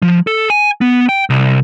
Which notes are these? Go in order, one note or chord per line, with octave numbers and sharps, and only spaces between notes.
F3
A4
G#5
B3
G5
C2